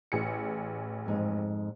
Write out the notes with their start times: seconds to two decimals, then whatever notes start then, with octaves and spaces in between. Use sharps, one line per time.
0.12 A1 G#4 C#7
1.06 F2 G#2